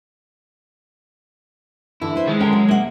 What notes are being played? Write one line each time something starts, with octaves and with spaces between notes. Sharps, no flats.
G2 D3 E3 E4
B4 C5
D#3 G#3
D3 C#4 A#4 G5
F#3
C3 A#3 F#5